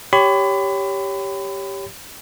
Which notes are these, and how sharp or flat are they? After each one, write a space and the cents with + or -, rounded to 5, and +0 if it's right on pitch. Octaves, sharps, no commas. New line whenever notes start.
G4 +0 C#5 +10 B5 +30